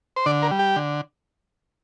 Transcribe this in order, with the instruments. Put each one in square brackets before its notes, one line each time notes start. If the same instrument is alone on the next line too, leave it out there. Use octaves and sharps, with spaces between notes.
[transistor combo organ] C5
D3 D5
A#4
G3
G4
D3